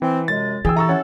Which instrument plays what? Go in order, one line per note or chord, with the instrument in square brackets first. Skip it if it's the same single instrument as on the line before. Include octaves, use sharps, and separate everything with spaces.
[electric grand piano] E3 [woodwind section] C4
[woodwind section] F#2 C3 G#3 [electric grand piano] A6
[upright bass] E3 [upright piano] G#4 G5 E6
[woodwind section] E4 G4 A4 [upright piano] A#5 C#6 E6
[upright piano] C#4 C#5 F#5